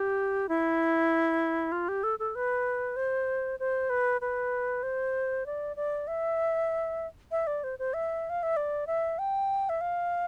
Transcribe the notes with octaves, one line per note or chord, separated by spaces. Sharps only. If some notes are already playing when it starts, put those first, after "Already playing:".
Already playing: G4
E4
F4
G4
A4
A4
B4
C5
C5
B4
B4
C5
D5
D5
E5
E5
D5
C5
C5
E5
F5
E5
D5
E5
G5
E5
F5